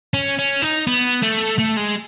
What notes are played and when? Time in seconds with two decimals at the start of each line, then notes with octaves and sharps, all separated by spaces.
0.14 C#4
0.38 C#4
0.62 D#4
0.87 B3
1.23 A3
1.59 A3
1.77 G#3